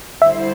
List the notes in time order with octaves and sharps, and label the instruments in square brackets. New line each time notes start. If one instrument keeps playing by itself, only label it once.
[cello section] D3 G3 E4 C5 [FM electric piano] E5